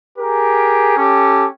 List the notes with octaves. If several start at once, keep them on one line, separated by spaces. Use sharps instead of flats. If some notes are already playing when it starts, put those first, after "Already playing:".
G4 G#4 A#4
C#4 G4 A4